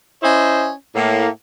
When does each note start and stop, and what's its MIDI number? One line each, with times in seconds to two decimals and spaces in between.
0.23 0.71 61
0.23 0.71 64
0.23 0.71 72
0.23 0.71 75
0.95 1.28 45
0.95 1.28 58